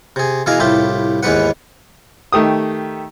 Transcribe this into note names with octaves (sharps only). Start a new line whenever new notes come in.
C3 G#4
B2 E3 E4 G#4 F5 A#5
C2 A2 F4 G4 E5
D#2 G#2 E3 B3 B4 F#5
D#3 A3 G4 D#6